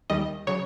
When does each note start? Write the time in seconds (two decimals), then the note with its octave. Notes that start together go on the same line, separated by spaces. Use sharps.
0.10 D#2 D#3 G3 D#5
0.47 C#3 F#3 C#5